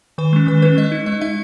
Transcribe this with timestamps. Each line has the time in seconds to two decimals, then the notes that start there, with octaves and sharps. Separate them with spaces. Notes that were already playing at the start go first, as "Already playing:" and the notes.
0.18 D#3 B4
0.33 G#3 C#4
0.47 D#3 B4
0.62 G#3 C#4 B4
0.77 G#3 D#5
0.92 D#4
1.06 G#3 D#5
1.21 D#4 E5